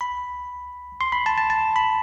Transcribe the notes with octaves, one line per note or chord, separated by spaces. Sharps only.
B5
C6
B5
A5
A5
A5
B5